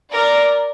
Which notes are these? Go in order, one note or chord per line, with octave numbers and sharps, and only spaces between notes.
A#4 D5